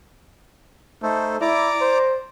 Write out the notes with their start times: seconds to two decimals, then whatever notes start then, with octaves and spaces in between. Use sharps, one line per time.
1.03 A3 D#4 A4 C5
1.41 E4 D5 A#5 D6
1.81 C5